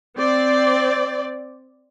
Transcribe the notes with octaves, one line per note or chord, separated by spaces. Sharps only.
C4 D5